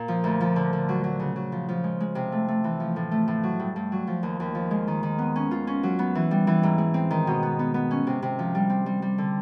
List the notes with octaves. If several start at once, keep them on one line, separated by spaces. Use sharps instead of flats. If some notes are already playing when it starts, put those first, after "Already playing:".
Already playing: A#2
F3
D2
F3
D3
D3
F#3
F#3
C#3
F#3
F3
F3
G#3
G#3
C3
A3
A3
E3
F3
A2
A3
A2
F#3
G2
G2
F#3
F3
D#2
D#2
F3
G#3
D#3
D#3
B3
C#4
F4
C#4
F#3
B3
E3
G3
E3
G#2
G#3
C4
D#3
B2
B3
B3
B3
C#4
C3
C3
F3
G3
C4
G3
G3
D3